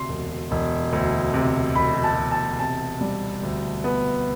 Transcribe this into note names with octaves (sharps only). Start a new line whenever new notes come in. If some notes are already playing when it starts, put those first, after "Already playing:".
Already playing: D2 C3 C6
E1
E1
D2
C3
E1 B5
A5
E1
A5
C3 A5
G3
D2
B3